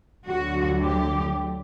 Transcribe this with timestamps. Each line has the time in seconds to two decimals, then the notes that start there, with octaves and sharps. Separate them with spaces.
0.25 D2 D3 F#3 F#4
0.81 G4